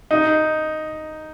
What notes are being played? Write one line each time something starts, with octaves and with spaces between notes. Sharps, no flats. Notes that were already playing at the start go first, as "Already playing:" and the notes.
D#4